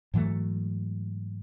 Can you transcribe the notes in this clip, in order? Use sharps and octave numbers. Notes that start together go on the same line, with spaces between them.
G#2 E3 F#3 A3